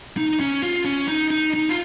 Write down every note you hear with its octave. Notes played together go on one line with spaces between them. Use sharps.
D#4
C#4
F4
C#4
D#4
D#4
D#4
F4